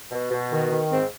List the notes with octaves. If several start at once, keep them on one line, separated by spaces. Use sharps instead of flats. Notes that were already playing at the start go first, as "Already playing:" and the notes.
B2
B2
D#3
D#3
G#2 C4